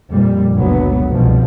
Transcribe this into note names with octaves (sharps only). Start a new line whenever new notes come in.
F2 A#2 G3
F#1 C#2 D3 F#3 B3
C2 B2 F3